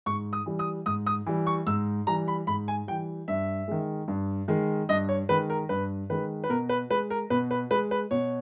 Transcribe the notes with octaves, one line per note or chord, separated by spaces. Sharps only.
G#2 C#6
D#6
E3 G3
D#6
G#2 D#6
D#6
E3 G3
C#6
G#2 E6
E3 G3 A#5
B5
G#2 B5
G#5
E3 G3 G5
G2 E5
D#3 G#3
G2
D#3 G#3
G2 D#5
C#5
D#3 G#3 B4
A#4
G2 B4
D#3 G#3 B4
B4
B2 A#4
B4
G#3 B4
A#4
B2 B4
B4
G#3 B4
B4
B2 C#5